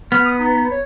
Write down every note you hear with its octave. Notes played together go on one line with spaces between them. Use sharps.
B3 F6
D#6
D#4
C#5